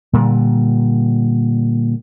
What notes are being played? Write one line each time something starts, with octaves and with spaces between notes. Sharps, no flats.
A#2 D3 G3